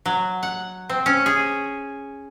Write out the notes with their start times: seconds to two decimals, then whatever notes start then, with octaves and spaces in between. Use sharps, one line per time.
0.06 F#3
0.43 F#5
0.89 C4
1.06 C#4
1.26 G#4